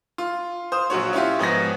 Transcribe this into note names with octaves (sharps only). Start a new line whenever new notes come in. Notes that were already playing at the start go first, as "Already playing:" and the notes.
F4
C5 F5 D#6
A#1 F#3 F#4 C#5
C#4 E4 F4 G4
G#2 F3 B3 A#6